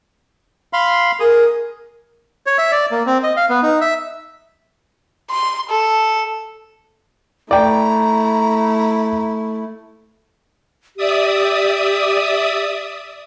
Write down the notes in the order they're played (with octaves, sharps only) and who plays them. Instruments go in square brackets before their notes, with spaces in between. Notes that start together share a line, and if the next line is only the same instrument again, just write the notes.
[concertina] F5 B5 C6
[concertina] G#4 D#6 [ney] A#4
[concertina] C#5
E5
D5
A#3
C4
D#5
F5
B3
D#4
E5
[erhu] C6
A4
[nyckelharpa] A3 [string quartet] E4 [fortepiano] D5 G5 [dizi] A#5
[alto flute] G4 [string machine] D5 E5 D#6